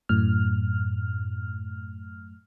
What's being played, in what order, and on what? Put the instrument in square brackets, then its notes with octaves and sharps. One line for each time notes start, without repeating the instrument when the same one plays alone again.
[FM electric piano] F#2 A2 F6